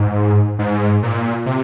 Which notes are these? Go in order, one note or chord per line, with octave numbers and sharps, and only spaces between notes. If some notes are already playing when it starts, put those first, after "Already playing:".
Already playing: G#2
G#2
A#2
C3